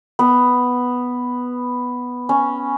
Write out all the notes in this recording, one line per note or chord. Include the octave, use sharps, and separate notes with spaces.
B3
C#4